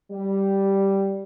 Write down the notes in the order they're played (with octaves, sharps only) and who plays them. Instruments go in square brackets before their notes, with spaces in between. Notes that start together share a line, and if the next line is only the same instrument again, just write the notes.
[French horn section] G3